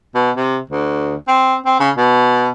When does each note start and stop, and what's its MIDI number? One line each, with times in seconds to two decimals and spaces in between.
0.15 0.31 47
0.36 0.58 48
0.70 1.16 38
1.28 1.56 60
1.66 1.80 60
1.80 1.90 49
1.97 2.50 47